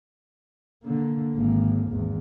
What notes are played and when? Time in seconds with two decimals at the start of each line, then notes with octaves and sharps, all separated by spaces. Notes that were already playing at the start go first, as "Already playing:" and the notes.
0.84 D3 A#3
1.35 G#1 A#3
1.87 G#1 E2